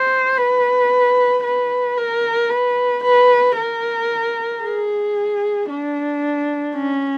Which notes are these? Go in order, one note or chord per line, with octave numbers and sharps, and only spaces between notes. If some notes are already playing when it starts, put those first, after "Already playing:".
Already playing: C5
B4
B4
A#4
B4
B4
A#4
G#4
D4
C#4